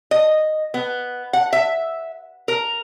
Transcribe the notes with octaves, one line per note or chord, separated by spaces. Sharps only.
D#5
B3
F#5
E5
A#4